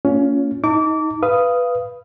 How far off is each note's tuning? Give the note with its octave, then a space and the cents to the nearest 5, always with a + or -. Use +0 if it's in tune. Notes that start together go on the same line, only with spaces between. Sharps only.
A#3 -30 C#4 +20 F4 +0
D#4 +20 A5 +45 D6 -25
B4 +0 F5 -20 D#6 +0